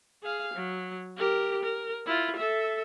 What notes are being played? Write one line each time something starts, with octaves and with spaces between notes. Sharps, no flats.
G#4 F5
F#3
G4 A#4
A#4
E4 F4
A4 E5